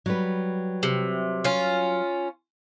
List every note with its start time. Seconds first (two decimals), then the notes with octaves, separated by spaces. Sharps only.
0.06 F#3 G3 B4
0.83 C3
1.44 C#4 F4